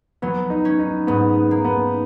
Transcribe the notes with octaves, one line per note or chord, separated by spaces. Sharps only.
F#3 B3
D#4
C#4
D#4
G#2 B3
B3
A#3
B3